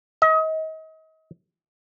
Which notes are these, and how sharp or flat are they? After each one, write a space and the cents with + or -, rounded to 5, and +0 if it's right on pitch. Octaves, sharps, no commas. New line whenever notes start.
D#5 +35